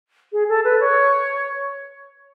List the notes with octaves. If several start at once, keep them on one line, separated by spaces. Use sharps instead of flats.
G#4
A4
B4
C#5